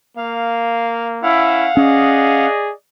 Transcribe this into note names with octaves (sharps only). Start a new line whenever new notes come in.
A#3 F5
C#4 E4 F5 F#5
C#4 G#4 D5 D#5